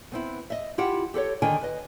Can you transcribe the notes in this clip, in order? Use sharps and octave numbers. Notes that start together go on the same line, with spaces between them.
B3 C4 E4
D#5 E5
E4 F4 G4 F#5
G4 A4 B4 C#5
D3 D#3 G5 G#5
B4 D#5